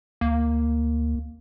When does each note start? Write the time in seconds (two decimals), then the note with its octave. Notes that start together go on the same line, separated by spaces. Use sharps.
0.21 D2 A#3